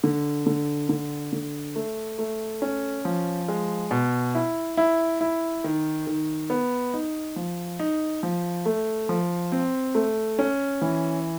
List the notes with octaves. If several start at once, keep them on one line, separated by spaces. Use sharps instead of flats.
D3
D3
D3
D3
A3
A3
C#4
F3
G#3
B2
E4
E4
E4
D#3
D#3
B3
D#4
F3
D#4
F3
A3
F3
C4
A3
C#4
E3